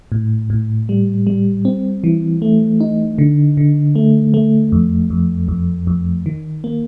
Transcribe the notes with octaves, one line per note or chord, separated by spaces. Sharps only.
A2
A2
G3
G3
C4
E3
A3
D#4
D3
D3
A3
A3
F2
F2
F2
F2
D#3
A#3